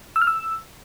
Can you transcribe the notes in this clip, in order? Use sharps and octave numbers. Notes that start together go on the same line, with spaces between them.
E6
F6
E6